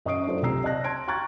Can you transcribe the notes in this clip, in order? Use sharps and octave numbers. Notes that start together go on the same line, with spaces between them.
F#2 D#5 C#6 D#6 C7 D7
F#3 D4 F4 A4 C5
C2 C3 A#5 E6 C7
D5 D#5 A5 F#6 A#6
A5 C6 G#6 D7
G5 A#5 C#6 F#6 G#6 A6